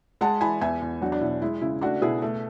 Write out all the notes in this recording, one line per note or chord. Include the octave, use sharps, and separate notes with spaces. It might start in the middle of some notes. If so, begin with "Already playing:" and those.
G#3 F#5 A5
E3 G#5 B5
E2 E5 G#5
E2
F#3 D4 F#4
D4
B2 E4
G#3 E4
C#3 E4
A3 D4 F#4
B2 E4 G#4
A3